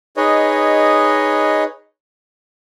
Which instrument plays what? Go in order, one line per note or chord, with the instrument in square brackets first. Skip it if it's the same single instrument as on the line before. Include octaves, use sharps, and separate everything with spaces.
[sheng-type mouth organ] D#4 G#4 B4 C#5 D#5